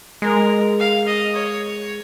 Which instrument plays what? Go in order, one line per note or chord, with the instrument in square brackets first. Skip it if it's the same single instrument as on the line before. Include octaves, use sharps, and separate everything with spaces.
[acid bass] G#3 [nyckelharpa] A#4
[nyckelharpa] F5
D#5
C#5